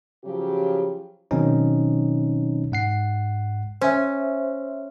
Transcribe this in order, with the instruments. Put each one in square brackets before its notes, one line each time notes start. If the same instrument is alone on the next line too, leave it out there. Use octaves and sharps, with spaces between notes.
[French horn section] C#3 F3 F#3 G4
[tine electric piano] B2 D#3 F#3 C4 C#4 D#4
G#2 F#5 C7
[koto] C#4 [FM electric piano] C5 E5